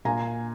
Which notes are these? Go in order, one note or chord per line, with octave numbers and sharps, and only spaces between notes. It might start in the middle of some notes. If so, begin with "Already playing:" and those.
A#2 G#5 A#5